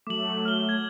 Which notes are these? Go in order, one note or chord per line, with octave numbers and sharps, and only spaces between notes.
F#3 A3 D6 F#7
F6 G7
G#6